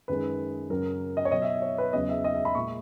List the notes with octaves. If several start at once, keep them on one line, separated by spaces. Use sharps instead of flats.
F#2 D#3 G#3 B4
F#2 C#3 F#3 A#4
D#5
C#5
B2 F#3 D#5
E5
C#5
B4
E2 C#3 F#3 D#5
E5
D#5
E5
B5
A#2 G#3 C#6